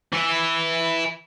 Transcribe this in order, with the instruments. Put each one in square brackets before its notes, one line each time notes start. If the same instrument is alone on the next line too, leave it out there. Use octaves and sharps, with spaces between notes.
[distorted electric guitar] E3 E4